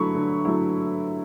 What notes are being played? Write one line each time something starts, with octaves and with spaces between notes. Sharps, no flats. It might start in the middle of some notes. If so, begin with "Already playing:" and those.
Already playing: D3 F#3 A3 E4 B5 C#6
D3
F#3 A3 E4